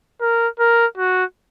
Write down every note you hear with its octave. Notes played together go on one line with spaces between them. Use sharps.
A#4
A#4
F#4